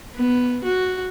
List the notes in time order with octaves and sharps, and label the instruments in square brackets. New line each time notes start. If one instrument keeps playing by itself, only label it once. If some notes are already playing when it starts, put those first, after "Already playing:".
[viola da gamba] B3
F#4